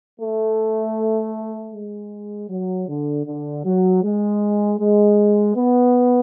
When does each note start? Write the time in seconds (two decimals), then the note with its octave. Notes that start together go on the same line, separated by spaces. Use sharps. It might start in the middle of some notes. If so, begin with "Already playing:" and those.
0.20 A3
1.73 G#3
2.49 F#3
2.89 D3
3.26 D3
3.64 F#3
4.03 G#3
4.79 G#3
5.56 B3